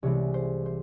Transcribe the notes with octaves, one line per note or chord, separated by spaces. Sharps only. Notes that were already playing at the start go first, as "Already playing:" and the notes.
C2 C3 E3 G#3 C4 C#5
C5
C5